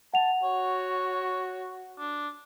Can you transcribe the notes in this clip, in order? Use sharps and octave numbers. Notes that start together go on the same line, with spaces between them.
F#5 A5 F7
F#4 C#5
D4